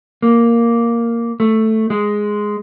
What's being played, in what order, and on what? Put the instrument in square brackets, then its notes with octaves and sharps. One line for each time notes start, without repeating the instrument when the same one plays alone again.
[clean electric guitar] A#3
A3
G#3